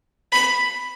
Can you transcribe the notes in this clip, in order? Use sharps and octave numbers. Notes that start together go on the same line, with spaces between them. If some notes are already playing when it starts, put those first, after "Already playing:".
B5